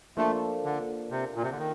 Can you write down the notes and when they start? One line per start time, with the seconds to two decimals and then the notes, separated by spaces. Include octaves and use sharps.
0.17 F3 A3 A#3 D4 F4 A4
0.64 D3
1.11 C3
1.35 A#2
1.43 C3
1.50 D3
1.58 D#3